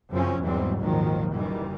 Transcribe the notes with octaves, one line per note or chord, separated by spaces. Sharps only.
F#2 C#3 F3 C4 C#4
E2 G#2 E3 F#3 G3 C4
G#1 D#2 A#2 D#3 F3 F#3
F#1 D#3 E3 G3